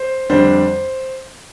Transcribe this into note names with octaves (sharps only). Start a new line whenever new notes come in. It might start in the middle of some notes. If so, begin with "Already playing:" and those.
Already playing: C5
F2 D3 G3 D4 C5